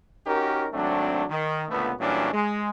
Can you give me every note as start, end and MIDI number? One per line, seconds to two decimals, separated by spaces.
0.25 0.67 61
0.25 0.67 63
0.25 0.67 66
0.25 0.67 67
0.25 0.67 70
0.73 1.23 32
0.73 1.23 54
0.73 1.23 57
0.73 1.23 60
0.73 1.23 62
1.29 1.64 51
1.69 1.92 37
1.69 1.92 46
1.69 1.92 50
1.69 1.92 57
1.69 1.92 59
1.99 2.31 46
1.99 2.31 52
1.99 2.31 54
1.99 2.31 55
1.99 2.31 61
1.99 2.31 62
2.32 2.70 56